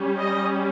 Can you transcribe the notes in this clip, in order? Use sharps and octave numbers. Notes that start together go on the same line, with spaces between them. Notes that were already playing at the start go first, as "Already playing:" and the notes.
Already playing: G3 C#4
D#5